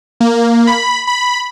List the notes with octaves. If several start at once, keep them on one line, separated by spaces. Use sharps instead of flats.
A#3
B5
B5